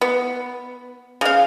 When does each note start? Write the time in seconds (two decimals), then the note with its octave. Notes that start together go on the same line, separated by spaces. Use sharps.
0.01 B3
1.21 C#3 F5